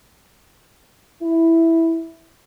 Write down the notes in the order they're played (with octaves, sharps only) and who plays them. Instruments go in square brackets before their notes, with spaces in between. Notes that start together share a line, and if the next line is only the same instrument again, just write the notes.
[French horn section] E4